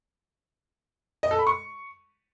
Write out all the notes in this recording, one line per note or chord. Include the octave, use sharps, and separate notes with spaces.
D#5
A4
B5
C#6